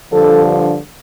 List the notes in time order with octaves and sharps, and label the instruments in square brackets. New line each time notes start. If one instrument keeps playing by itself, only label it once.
[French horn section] G2 D3 F3 A4